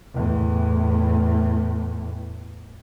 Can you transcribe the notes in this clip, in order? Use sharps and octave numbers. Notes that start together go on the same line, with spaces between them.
E2 A2